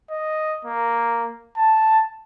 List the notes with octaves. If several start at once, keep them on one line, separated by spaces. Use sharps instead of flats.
D#5
A#3
A5